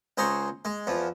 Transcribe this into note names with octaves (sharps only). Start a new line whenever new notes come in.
C#2 G#4 C5 A#5 C#6
G#3
E2 F3